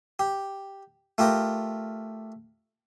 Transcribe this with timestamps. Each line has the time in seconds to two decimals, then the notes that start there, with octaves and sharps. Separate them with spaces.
0.19 G4
1.18 A3 F4 G4 A#4